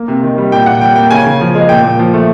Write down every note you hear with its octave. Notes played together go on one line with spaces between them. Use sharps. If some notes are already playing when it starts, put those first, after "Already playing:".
Already playing: A#3
C3
D#3
G3
A#2 G5
A#2 F#5
G3 G5
A#3 G5
C#3 G#5
C#3
F3
G#3
A#2 G5
A#2
F3
A3